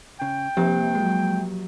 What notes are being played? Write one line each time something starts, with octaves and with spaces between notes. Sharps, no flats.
C#3 G5
C2 G2 F3 A#3 C4 G4
F#3 G#3